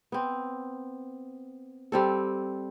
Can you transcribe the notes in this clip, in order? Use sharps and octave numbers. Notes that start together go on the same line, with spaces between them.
B3 C4
G3 C4 A4